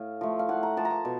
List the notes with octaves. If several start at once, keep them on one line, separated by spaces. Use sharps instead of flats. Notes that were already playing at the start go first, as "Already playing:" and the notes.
Already playing: A2 F5
F3 A3
F5
A2 F#5
A#5
F3 A3 A5
A#5
A5
B2